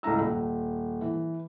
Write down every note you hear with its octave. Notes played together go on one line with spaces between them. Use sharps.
C#2 A3 E4 A#5 E6
D#1
E3